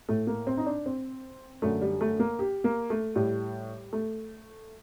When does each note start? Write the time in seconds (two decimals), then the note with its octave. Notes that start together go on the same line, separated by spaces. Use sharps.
0.09 A2 A3
0.27 A#3
0.47 C4
0.57 D#4
0.66 D4
0.86 C4
1.62 F#2 D3 A3
1.81 G3
2.01 A3
2.20 A#3
2.39 G4
2.64 A#3
2.90 A3
3.15 A2 G3
3.93 A3